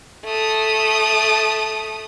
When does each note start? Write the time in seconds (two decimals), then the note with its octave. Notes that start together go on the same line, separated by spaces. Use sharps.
0.25 A3 D#6